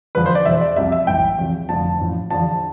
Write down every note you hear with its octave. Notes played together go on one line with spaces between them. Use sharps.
E2 D3 F3 B4
C5
D5
E2 B2 E5
D5
C2 C3 F3 E5
E5
B1 A2 E3 G5
E2 C3 F3
F1 F2 D3 F3 A5
A1 A2 F3
E2 D3 F3 A5